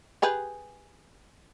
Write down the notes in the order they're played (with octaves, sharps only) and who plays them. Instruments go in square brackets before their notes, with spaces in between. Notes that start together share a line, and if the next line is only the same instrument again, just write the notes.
[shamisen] G4 G#4 B4